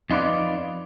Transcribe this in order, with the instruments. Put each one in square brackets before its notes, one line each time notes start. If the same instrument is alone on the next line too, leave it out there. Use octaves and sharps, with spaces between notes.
[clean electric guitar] F2 D#4 F4 B4 D5